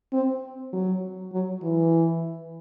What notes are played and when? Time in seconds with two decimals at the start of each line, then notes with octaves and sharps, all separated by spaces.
0.13 C4
0.73 F#3
1.32 F#3
1.63 E3